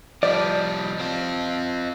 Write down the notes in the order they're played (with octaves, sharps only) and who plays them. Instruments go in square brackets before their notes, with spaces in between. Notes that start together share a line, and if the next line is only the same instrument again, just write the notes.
[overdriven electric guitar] F3 G3 [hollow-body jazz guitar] D5 [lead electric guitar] D#5 A5
[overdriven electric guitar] C4 F4